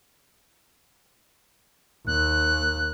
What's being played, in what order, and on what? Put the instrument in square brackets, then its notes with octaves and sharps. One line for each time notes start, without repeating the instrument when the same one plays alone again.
[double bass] D#2 [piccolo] F#6